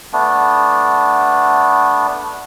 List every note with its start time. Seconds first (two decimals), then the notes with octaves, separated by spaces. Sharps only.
0.13 A3 B3 D4